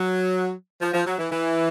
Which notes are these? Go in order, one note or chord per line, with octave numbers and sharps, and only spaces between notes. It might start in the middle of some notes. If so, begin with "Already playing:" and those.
Already playing: F#3
F3
F3
F#3
E3
E3